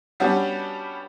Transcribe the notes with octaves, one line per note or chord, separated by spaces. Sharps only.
G3 B3 C#4 D4 F#4 G4